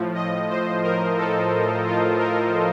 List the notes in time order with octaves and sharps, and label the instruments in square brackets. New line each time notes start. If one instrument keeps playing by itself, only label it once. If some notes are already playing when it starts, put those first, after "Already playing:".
Already playing: [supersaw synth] A2 F3
D#5
C5
A#4
A4
F4
A#4